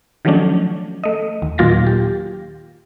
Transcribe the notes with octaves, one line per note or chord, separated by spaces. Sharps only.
D#3 F3 F#3 A3 C#4 D4
A3 D#5
D#2
A#2 D#3 F#3 F4 A6 A#6
G4